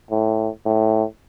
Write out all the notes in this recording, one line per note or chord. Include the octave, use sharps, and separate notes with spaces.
A2
A2